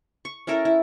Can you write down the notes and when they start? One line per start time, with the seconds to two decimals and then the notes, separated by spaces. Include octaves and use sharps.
0.25 C#6
0.47 C#4 E4 A4 A#4
0.65 E4